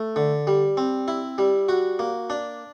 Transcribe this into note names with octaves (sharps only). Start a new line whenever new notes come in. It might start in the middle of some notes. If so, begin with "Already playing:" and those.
Already playing: A3
D3
G3
C4
E4
G3
F#4
A#3
D4